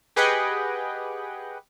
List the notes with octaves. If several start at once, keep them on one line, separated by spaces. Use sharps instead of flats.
G4 G#4 B4 D#5 F#5 G5